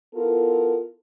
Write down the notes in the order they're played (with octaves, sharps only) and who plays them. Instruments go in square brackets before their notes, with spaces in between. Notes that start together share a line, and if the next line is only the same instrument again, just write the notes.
[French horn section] B3 E4 F4 A4 A#4